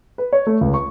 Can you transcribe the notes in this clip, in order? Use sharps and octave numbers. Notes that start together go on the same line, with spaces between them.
B4
C#5
A3
C#2
C#6